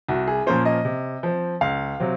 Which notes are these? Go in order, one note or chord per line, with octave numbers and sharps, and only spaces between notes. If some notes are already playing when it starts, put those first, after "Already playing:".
C2 F#4
G#4
A#2 F3 A#3 C#4 C5
D#5
C3
F3 C4
C#2 F5
C3 F#3 C4